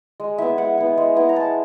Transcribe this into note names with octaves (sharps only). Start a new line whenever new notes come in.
G#3
B3 E4 E5
G#3 F#5
B3 E4
G#3
B3 E4
A#5
G#3 A5